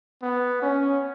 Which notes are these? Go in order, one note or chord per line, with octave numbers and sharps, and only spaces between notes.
B3
C#4